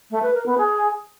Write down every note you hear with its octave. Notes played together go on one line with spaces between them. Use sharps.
A3
B4
A#4
B3
G#4